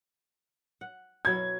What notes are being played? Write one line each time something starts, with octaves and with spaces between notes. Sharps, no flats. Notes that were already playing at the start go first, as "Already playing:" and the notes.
F#5
B2 F#3 E4 G#6